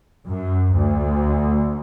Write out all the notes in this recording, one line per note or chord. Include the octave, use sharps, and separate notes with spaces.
F#2
D2